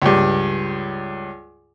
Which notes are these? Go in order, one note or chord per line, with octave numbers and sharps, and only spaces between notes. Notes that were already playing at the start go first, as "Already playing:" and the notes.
C#2 G2